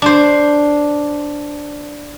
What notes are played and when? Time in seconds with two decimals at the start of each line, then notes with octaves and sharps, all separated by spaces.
0.02 D4 C5